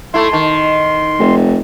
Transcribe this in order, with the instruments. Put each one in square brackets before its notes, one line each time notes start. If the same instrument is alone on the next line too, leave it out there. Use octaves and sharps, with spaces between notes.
[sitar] A3 E4 [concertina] C6
[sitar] D#3
[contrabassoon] F1